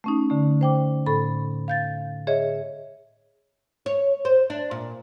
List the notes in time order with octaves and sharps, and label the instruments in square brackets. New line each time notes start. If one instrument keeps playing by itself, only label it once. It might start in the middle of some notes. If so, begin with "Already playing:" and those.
[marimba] A3 C#4 D#4
D3 A3
C5 G5 D6
A2 A4 B5
F5 G6 A6
G#4 C#5 D#5 E5
[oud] C#5
C5
D4
A#2